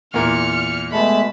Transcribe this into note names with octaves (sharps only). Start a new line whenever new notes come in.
E2 A#2 A#4 F6 C#7
B2 G#3 A3 A5 B5